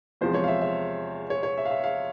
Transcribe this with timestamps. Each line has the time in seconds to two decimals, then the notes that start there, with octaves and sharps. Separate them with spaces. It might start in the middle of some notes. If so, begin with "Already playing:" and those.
0.21 E2 C3 F3 G#3 C5
0.34 C#5
0.44 F5
0.48 E5
0.61 E5
1.30 C#5
1.43 C#5
1.57 E5
1.66 F5
1.71 E5
1.84 F5